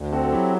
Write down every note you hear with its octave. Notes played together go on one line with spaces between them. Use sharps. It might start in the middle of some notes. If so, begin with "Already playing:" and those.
Already playing: D2
C4 F#4 A4
A4
F#3 E4 G4